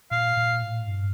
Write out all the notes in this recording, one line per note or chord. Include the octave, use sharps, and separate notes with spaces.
A#2 F5
A#2
A2
G2